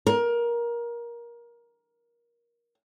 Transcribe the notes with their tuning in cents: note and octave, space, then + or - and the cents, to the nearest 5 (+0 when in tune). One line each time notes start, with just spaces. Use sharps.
A#4 +20